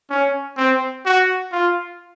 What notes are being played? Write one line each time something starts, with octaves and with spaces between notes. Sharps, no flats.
C#4
C4
F#4
F4